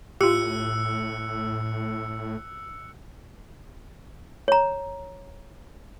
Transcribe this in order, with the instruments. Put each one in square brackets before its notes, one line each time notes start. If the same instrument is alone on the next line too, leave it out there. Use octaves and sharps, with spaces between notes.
[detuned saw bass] A2 [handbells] F4 G4 [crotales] E6 F#6 C#7
[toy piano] C#5 A#5